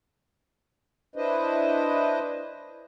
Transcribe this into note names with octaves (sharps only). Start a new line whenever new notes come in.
D4 E4 B4 C5 D#5